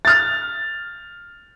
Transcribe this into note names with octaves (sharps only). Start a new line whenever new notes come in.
F6 A6